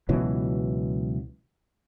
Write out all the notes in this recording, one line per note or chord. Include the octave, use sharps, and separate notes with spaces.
C#2 B2 E3 F#3